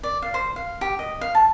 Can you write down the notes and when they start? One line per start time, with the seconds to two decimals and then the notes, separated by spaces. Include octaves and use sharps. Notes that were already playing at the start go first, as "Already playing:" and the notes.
0.03 D5
0.22 F5
0.34 C5
0.56 F5
0.81 G4
0.99 D#5
1.21 F5
1.35 A5